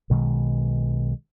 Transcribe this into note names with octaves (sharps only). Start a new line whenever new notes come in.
B1 B2 D#3 G#3